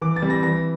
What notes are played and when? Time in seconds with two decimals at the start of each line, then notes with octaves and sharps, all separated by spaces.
0.01 E3 D6
0.16 A6
0.22 G3 C4
0.30 A#6
0.43 E3 A#6